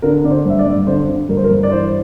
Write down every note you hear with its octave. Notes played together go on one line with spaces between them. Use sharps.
D3 A#4
D3 D5
C5
G2 E5
D5
G2
D3 C5
D3
G2 A#4
C5
A#4
G2
D5
E3 C5